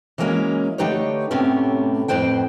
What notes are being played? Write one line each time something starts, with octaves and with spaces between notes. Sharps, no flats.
E3 F#3 G#3 A#3 C#4
D3 A3 D#4 G4 B4 C#5
A2 C3 A3 B3 C#4 G4
F2 A2 G#3 B4 C5 G5